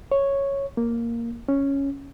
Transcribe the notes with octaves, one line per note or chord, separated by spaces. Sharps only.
C#5
A#3
C#4